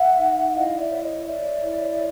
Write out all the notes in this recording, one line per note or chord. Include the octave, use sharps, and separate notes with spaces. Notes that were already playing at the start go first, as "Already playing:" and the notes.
Already playing: E5 F#5
D#4
E4 D#5 F5
D5 E5
C#5
C#5 D#5
C#5 D5 E5
E4